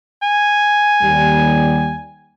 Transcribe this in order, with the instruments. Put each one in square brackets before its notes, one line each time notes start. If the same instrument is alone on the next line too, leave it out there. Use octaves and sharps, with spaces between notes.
[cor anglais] G#5
[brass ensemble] D#2 G3